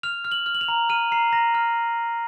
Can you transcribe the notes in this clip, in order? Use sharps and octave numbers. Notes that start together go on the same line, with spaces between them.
F6 F7
F6
F#7
F6
F#7
F7
A#5
F6 D#7
A#5 C7
A#5 A#6
F6